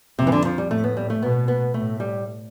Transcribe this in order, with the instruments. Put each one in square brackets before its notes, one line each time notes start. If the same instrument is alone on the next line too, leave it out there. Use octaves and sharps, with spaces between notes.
[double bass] F2 [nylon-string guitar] C3
[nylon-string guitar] E3
D3
F3
G3
[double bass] A2 [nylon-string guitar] A3
[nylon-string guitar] B3
G3
A3
[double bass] B2 [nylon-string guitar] B3
[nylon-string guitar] B3
[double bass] A2 [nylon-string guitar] A3
[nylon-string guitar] G3